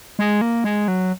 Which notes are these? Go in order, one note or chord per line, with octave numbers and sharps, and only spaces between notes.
G#3
A#3
G#3
F#3